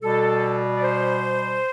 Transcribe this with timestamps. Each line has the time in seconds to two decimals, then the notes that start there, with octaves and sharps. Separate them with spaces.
0.02 B2 G3 A4
0.76 D5
0.81 C5